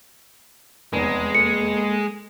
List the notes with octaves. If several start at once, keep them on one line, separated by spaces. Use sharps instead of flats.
F1 E2 G#3
A#3 A4 C#7